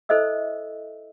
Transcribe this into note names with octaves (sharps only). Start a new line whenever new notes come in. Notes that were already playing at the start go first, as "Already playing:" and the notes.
E4 A4 C5 D#5 E5 E6